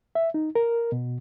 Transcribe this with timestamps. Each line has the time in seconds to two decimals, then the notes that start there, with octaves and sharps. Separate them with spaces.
0.15 E5
0.34 D#4
0.55 A#4
0.92 B2